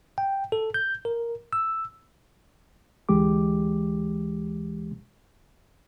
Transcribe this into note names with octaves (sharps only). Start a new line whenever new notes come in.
G5
A4
G6
A#4
E6
D2 E3 G#3 G4 D6